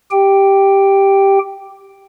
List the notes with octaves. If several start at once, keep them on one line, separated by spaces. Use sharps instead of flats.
G4 G5